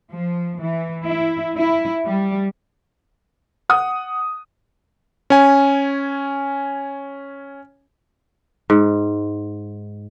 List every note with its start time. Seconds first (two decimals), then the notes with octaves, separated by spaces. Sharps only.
0.10 F3
0.60 E3
1.05 E4
1.57 E4
2.05 G3
3.69 F#5 D#6
5.30 C#4 G#5
8.70 G#2